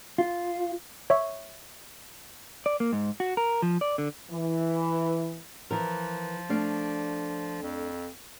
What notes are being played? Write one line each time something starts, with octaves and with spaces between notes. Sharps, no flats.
F4
C#5 E5 C#6
D5
A#3
G#2
F#4
A#4
F3
D5
D3
E3
E3 F3 A#4
A3 D4 F5
F2